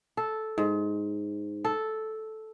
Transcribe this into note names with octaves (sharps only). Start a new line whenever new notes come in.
A4
G#2
A4